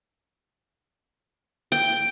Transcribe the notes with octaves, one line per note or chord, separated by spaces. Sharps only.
G5